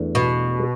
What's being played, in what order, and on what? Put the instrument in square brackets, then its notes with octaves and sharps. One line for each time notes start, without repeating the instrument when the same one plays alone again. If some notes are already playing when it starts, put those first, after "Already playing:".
Already playing: [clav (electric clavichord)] E2 E3 A3 D4
[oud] B2